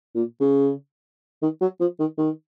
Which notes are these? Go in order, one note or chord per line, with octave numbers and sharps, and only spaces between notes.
A#2
C#3
D#3
F#3
F3
D#3
D#3